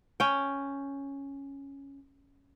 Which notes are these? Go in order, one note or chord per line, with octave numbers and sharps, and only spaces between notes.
C#4 G5